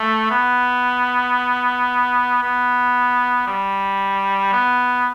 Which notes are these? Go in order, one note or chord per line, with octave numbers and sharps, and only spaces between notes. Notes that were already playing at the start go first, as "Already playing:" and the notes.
Already playing: A3
B3
B3
G3
B3